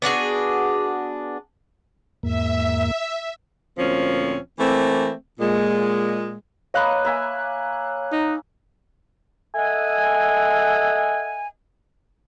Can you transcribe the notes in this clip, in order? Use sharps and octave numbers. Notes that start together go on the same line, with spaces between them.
B3 D4 F#4 G#4
E2 G#2 A#3 E5
D2 A#2 F3 C4 C#4
E3 A3 A#3 C4
A#2 G#3
A#3 B4 C#5 D#5 F5 F#6
A#3 E5 G#5
D#4
A4 D#5 E5 F#5 G#5